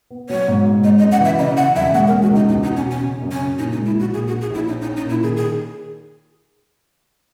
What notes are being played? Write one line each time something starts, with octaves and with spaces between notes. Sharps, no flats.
B3
F#3 C#5
G#2
G#2
G#3 D#5
D#5
F#2
F#5
E3 E5
C#3 D#5
C#3 F#5
E1 E5
G#3 F#5
A#4
G#3
F#4
C#2
D#4
E2 D#4
D#4
B2
C#4
B2
C#4
C#3
F#2
C#4
C#3
A#2 D#4
D#4
G#3
E4
A#1 F#4
A#2 G#4
F#4
D#4
G#4
A#1 E4
C#4 D#4
D#4
C#4
D#4
A#2 E4
D#3 G#4
G#4